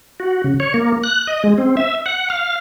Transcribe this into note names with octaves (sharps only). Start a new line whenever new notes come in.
F#4
C#3
C#5
A#3
F#6
D#5
G#3
C4
E5
F#5
F5